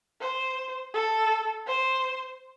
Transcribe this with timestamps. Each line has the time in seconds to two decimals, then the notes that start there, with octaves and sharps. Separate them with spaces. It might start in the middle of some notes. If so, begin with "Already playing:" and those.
0.21 C5
0.94 A4
1.67 C5